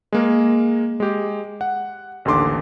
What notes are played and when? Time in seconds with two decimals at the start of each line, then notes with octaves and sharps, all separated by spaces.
0.12 G#3 A#3 A#4
1.00 G#3 G4
1.61 F#5
2.25 A1 D#2 D3 C6 D6